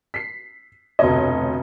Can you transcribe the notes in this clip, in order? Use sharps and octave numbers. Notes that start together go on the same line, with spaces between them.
B6 C7
F1 D2 B2 C#5 D#5